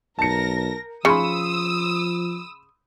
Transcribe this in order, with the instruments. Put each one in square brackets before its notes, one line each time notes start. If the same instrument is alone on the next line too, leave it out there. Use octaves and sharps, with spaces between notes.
[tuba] B1 [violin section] A#4 A#6 [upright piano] A5 C#7
[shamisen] C#3 [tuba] F3 [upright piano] B5 C6 C#7 [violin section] D#6 E6